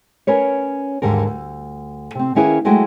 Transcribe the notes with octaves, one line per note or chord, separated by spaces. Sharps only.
C#4 A#4 B4 C#5
D#2 G#2 D3 G3 A#4
D2
C3 C4
D#3 A#3 C#4 E4 G#4 B4
F#3 G#3 A3 E4 F#4 G5